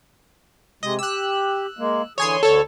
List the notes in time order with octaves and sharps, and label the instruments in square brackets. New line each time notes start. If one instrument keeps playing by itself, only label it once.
[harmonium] C3 G#3 [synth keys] D#5
[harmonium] G4 [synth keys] E6 F#6
[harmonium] G#3 A#3
[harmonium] D3 E3 G#4 [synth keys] C#5 G#5 C6
[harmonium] D2 D3 [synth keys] A4 C#5